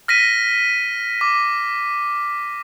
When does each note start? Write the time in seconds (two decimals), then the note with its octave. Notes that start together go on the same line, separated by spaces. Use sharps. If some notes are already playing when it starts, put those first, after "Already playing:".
0.08 F6 A#6 B6 D#7
1.21 D6